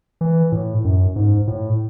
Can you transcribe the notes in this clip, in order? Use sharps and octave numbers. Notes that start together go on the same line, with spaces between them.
E3
A2
F#2
G#2
A2